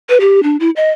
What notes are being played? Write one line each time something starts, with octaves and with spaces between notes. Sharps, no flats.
B4
G4
D4
E4
D#5